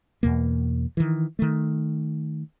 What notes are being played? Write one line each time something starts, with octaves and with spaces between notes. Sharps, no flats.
E2 B2 A#3
D#3 E3
D#3 A3